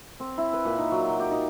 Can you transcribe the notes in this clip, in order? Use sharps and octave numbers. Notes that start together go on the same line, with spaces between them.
C4
E4
B4
A#2
D#4
F#3
G5
G4
D#4